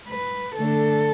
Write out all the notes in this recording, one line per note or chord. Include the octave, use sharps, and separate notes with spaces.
B4
D3 A3 D4 A4